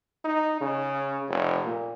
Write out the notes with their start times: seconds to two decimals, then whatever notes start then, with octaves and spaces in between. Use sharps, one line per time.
0.25 D#4
0.61 C#3
1.28 F1
1.64 A#2